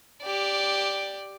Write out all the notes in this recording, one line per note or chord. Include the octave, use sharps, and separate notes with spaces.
G4 D5